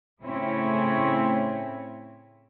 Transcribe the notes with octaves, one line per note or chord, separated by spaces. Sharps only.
A2 C#3 C4 C#4 E4 C#5